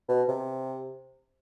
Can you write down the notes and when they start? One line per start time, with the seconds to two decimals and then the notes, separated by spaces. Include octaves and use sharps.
0.09 B2
0.29 C3